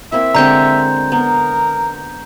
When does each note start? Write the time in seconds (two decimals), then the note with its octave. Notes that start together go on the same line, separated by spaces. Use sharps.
0.12 A#3 C4 E4 E5
0.35 D3 G#3 C4 A#5 G6
1.12 B3 A#4